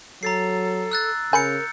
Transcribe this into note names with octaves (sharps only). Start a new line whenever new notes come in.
F#3 A4 A#5 A6 C7
E6 F#6 A6
C#3 A#4 G#5 B5 G6 C#7